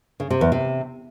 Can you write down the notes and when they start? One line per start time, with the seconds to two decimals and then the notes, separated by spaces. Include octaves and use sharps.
0.20 C#3
0.30 C3
0.41 E2
0.52 C3